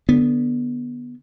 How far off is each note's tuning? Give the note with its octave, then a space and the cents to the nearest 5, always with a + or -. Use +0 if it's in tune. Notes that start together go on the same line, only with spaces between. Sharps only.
D3 +0 B3 -10